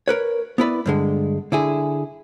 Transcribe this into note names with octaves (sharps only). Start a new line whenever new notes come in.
A#4 B4 C#5
B3 E4 B4 D5
G2 D3 G#3
D3 E4 G#4